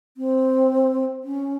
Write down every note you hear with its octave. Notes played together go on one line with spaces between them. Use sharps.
C4
C#4